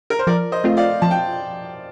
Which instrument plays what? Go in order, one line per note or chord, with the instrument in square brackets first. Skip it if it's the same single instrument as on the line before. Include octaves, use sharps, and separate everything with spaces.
[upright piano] A#4
C5
[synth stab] F3 [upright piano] A#4 D5
[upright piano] C5 D#5
[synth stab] A3 C4 F4
[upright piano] D5 F5
[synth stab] F3 [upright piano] A5
[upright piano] G5